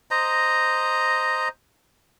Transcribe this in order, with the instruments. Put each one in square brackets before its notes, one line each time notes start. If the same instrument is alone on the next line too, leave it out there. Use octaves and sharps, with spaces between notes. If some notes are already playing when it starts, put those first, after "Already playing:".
[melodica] C5 D#5 A#5